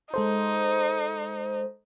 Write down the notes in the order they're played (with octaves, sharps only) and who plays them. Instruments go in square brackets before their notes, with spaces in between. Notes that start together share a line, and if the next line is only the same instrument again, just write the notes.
[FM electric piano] G#3 A4 C5 [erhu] D#4